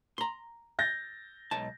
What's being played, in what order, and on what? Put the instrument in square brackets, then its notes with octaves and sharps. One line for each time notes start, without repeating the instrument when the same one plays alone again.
[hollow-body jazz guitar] A#5 C6
[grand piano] G6 A6 A#6
[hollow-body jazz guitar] B1 G#3 A5